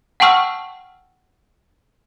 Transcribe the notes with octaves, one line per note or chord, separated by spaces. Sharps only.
F#5 G5 A5 C#6 E6 F6